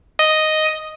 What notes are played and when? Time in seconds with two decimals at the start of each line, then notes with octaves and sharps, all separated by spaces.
0.19 D#5